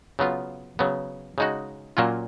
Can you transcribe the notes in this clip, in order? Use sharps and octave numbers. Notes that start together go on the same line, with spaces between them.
C#3 F#3 B3 F4
C#3 F#3 B3
C#3 G#3 D#4 F#4
A#2 F#3 A#3 C#4 F4